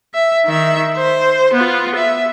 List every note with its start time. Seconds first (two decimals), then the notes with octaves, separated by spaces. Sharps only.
0.14 E5
0.46 D#3 E5
0.97 C5
1.53 B3 F4
1.95 E5